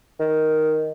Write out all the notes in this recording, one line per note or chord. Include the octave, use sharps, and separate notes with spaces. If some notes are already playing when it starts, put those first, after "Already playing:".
D#3